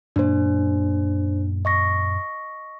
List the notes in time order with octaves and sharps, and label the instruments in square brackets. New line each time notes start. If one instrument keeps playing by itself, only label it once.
[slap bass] F#2 A#2 A#3 [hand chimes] D4 C5
[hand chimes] D#5 C#6 A#6